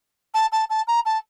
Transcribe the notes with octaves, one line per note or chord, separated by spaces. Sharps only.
A5
A5
A5
A#5
A5